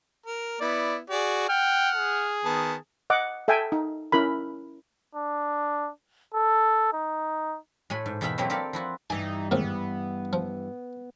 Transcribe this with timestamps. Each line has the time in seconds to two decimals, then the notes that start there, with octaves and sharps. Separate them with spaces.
0.26 A#4
0.61 B3 E4 D5
1.10 F#4 G#4 D5
1.49 F#5 G5 F6
1.95 G#4
2.45 D#3 B3 A5
3.10 D#5 F#5 D6
3.48 A4 E5 G5 G#5
3.72 D#4
4.12 C#4 E4 A#4 B5
5.15 D4
6.34 A4
6.93 D#4
7.90 A2 A3 G#5 B5
8.06 G#2
8.21 E2 B2 E5 F5 G5 B5
8.38 F#3 A3 A#3 C4 E4 G4
8.50 G4 A4 A#4 D5 F5
8.73 F3 E4 F#4
9.10 G2 E3 D#4 G#5
9.51 D#2 G#2 C3 B3
10.33 F3